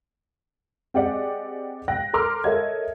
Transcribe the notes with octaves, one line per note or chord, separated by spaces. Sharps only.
C4 G4 G#4 D5 D#5 F#5
G5 F#6 A#6
A4 A#4 A#5 C6 D6 F6
A4 A#4 C#5 D#5 E5 G#6